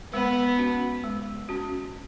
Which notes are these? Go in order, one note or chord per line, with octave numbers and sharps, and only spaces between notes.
G#3 B3
C#4 F#4
G#3
C#4 F#4